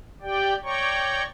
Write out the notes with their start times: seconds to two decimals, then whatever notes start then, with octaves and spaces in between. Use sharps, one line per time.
0.22 G4 D5 G5
0.63 C#5 D5 G5 A#5 C#6